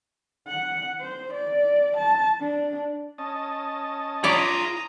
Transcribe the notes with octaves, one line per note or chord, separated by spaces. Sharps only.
F#5
C5
D5
A5
D4
C#4 D#5 A5
F4 C#5 D5 A#5 B5 D#6